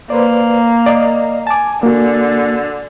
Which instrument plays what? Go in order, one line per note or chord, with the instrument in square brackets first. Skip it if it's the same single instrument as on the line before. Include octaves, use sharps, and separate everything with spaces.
[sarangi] A#3 [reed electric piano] B4 C5 D5
[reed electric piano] D5 D#5
[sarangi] G#5 [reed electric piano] A5 D6
[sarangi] D3 [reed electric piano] A#3 F#4